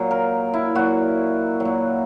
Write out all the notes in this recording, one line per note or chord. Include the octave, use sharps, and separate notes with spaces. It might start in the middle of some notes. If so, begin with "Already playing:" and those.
Already playing: A#2 F#3
A#4
E4
A#2 F#3 F#4
F#3
A#2